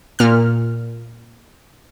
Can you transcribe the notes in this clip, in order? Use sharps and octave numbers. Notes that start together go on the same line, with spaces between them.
A#2 F6